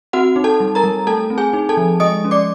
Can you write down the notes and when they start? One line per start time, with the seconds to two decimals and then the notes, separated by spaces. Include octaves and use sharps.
0.13 C4 F#4 F#5
0.36 D#4
0.44 A4 A5
0.60 G3
0.75 A#4 A#5
0.84 G3
1.07 A3 A4 A5
1.30 C4
1.38 G#4 G#5
1.53 D#4
1.69 A4 A5
1.77 F3
2.00 G#3 D#5 D#6
2.24 C#4
2.31 D5 D6